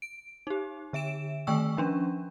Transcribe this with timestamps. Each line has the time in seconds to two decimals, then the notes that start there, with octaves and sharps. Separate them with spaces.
0.02 D7
0.47 D#4 G4
0.93 D3 E5 D7 E7
1.47 D#3 A3 G5 C#6 E6
1.77 F3 C#4 D4